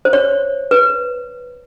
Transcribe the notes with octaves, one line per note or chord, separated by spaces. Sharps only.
C5
C#5
B4